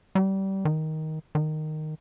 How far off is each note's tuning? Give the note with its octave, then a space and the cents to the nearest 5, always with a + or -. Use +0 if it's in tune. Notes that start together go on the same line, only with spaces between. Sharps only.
G3 -25
D#3 +10
D#3 -10